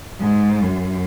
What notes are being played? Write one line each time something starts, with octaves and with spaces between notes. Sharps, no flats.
G#2
F#2